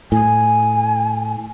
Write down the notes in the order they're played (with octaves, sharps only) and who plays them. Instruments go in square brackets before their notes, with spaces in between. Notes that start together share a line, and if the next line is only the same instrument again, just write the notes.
[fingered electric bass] A2 [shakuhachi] G#5